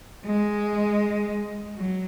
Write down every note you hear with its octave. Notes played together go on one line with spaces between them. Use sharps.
G#3
F#3